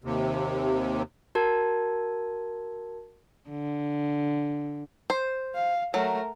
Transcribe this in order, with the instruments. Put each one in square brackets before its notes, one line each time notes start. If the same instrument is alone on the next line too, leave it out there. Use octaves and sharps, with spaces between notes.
[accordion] D#2 C3
[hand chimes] F#4 A#4 A5 G#6
[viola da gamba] D3
[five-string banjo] C5
[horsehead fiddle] F5
[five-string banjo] F#3 [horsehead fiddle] A3 A#4